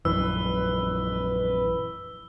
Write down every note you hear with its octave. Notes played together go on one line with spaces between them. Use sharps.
A#1 F#2 E3 B4 E6